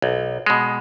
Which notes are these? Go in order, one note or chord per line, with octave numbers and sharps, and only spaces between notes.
B1
B2 G#3